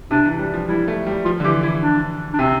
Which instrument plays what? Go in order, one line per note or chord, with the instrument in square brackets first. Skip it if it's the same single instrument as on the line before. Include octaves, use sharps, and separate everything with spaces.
[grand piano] C3 [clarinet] D4
[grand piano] E3
G3
F3
[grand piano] G3 [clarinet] E4
[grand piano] A3
G3
[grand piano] F3 [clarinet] F4
[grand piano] D3
[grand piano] E3 [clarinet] G4
[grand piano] E3 [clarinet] E4
[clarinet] D4
D4
[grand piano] C3 [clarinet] C4